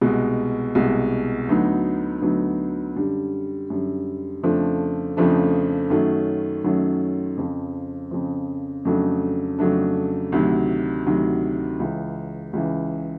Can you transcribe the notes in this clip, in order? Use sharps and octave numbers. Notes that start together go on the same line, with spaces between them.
C2 B2 G#3
C2 B2 G#3
D2 D3 F#3 B3 D#4
D2 D3 F#3 B3 D#4
F#2 D3 G3
F#2 D3 G3
F2 C#3 F3 A3 D4
F2 C#3 F3 A3 D4
F#2 D#3 F#3 A3 C#4
F#2 D#3 F#3 A3 C#4
F2 C#3 F3
F2 C#3 F3
F2 C#3 F#3 A3 D4
F2 C#3 F#3 A3 D4
D2 C3 D#3 F#3
D2 C3 D#3 F#3
C#2 C#3 E3
C#2 C#3 E3